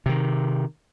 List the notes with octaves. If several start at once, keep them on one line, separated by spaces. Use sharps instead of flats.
C3 D#3